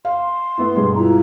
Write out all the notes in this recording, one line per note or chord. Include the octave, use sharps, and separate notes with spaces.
F5 C6
A3 B3 E4
G2 B2 G#3
E4 F4 A#5